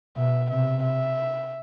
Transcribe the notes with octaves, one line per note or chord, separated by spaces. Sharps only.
B2 E5
C3 E5
E5